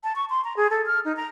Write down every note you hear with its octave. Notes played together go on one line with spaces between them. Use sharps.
A5
C#6
C6
A#5
G#4
A4
F6
D#4
A#5